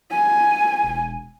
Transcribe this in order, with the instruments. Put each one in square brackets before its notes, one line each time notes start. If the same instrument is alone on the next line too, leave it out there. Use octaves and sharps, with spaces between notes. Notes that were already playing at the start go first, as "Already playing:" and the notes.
[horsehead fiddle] G#5
[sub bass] E1